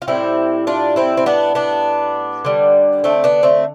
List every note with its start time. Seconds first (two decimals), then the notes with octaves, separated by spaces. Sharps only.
0.02 F4
0.07 A2 G3 C4 E4
0.67 D4 F4
0.96 C4 E4
1.17 C4
1.26 B3 D4
1.55 B3 D4
2.45 D3 G3
3.04 A3 C4
3.24 B3 D4
3.43 A3 C4